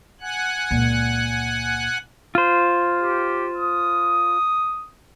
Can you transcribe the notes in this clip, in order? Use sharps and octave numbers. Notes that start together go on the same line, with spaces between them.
F#5 G#5 F#6
C#2 A#2
F4 C5
G4
D#6